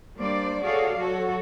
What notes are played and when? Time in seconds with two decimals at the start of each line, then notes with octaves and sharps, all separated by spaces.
0.16 G3 A#3 D4 C5 D5
0.63 F#4 G#4 A4 C#5 D5 F5
0.97 F#3 F#4 A4 C#5